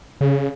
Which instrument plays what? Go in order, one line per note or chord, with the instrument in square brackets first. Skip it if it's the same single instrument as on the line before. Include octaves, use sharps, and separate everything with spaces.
[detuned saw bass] C#3